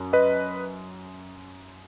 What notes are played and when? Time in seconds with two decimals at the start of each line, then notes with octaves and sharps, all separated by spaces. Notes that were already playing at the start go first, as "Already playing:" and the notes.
Already playing: F#2
0.13 B4 D#5